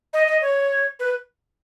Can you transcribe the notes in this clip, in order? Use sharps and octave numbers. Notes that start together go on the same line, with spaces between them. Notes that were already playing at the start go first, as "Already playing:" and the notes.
D#5
D#5
C#5
B4